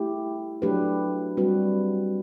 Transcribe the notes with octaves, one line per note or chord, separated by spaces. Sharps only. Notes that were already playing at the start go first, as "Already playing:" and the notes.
Already playing: A3 E4 G4
F#3 A3 D4 G4 B4
G3 C4 F#4 B4